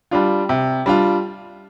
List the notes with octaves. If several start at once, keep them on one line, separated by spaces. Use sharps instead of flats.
G3 D4 F4
C3
G3 D4 F4